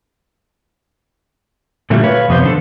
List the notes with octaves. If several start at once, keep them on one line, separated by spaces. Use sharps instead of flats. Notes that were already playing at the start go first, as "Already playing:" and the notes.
A#2 D3 F#3 G3 A3 A#3
B4 C#5 F5
F2 C3 B3 E4 C5
D#3 D4 A4